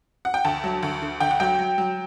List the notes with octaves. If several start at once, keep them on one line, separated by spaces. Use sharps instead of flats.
F#5
G5
D2 A5
F#3
D2
D3
D2 G5
F#5
F#3 G5
F#3
F#3